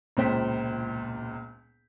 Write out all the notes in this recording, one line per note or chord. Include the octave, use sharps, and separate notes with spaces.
E1 C#2 A#2 C5 G5 B6